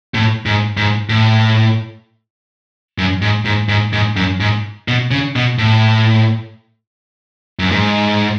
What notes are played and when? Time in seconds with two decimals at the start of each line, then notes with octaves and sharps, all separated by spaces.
0.14 A2
0.46 G#2
0.77 G#2
1.09 A2
2.98 F#2
3.22 G#2
3.45 G#2
3.69 G#2
3.93 G#2
4.17 F#2
4.40 G#2
4.88 B2
5.11 C#3
5.36 B2
5.59 A2
7.59 F#2
7.71 G#2